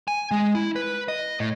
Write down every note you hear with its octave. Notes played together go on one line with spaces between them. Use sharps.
G#5
G#3
E4
B4
D#5
A2